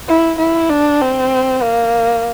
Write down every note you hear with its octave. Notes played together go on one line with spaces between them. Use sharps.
E4
E4
D4
C4
A#3